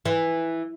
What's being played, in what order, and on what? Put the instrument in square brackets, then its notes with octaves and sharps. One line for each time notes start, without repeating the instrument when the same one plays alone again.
[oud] E3